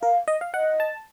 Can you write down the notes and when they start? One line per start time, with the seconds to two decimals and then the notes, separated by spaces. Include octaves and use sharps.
0.02 A#4 F5
0.28 D#5
0.41 F5
0.54 D#5 F#5
0.80 A5